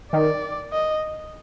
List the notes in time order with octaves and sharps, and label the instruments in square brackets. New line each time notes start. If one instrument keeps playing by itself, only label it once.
[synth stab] D#3 [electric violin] D5
[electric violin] D#5